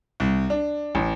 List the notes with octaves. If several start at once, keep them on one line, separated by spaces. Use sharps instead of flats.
C2
D4
A1